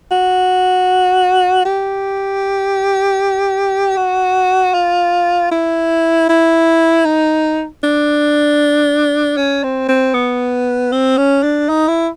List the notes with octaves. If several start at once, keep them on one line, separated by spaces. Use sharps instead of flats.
F#4
G4
F#4
F4
E4
E4
D#4
D4
C#4
C4
C4
B3
C4
C#4
D4
D#4
E4